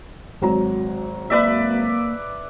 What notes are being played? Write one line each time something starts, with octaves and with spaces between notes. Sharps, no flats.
G#1 F#3 A#5
A#3 B4 D5 E5